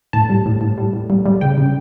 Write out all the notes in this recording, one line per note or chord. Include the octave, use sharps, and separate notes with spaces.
A2 A5
G3
A2
A2
G3
A2
G3
G3
C#3 G5
C#3